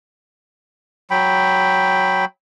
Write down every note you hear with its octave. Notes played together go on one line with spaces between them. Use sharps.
F#3 G5 B5